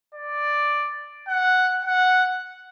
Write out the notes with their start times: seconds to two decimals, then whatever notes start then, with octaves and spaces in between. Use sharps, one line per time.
0.14 D5
1.28 F#5
1.85 F#5